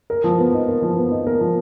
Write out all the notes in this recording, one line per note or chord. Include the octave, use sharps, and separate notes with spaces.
A#4
F3
B3
D#4
A#4
F3
B3
D#4
A#4
F3